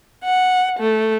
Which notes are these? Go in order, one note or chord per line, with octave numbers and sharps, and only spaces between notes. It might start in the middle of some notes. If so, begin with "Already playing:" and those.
F#5
A3